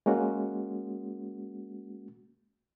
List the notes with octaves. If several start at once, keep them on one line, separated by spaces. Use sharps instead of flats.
G#3 A#3 C#4 F#4